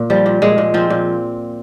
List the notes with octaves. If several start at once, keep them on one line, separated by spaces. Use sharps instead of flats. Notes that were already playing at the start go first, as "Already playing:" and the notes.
Already playing: A#2 A#3
F3 G3
A#2
A#2 G#3
A#2
F3 C4
A#2